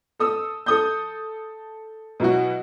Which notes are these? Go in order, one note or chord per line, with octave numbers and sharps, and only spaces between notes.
A4 D#6 E6
A4 D#6 G6
B2 F#3 E4 F#4